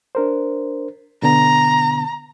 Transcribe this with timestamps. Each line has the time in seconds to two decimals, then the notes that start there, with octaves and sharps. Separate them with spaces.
0.15 D4 A#4 C5
1.22 B2 D3 B3 A#5